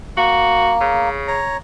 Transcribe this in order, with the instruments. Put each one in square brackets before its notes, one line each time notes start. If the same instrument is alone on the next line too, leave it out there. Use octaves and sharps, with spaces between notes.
[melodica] A#3 [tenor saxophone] F#4
[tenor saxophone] C#3
[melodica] C#5 A#5